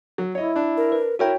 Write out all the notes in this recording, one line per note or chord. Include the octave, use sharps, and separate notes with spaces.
F#3
E4 C#5 D#5
D4
A#4
B4
E4 F#4 A#4 C#5 E5 G5